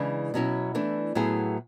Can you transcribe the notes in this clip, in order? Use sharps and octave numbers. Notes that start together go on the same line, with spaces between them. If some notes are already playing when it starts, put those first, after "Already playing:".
Already playing: C#3 E3 G#3 D4
B2 F#3 C#4 E4
E3 A3 D4
A2 F#3 B3 E4 G#4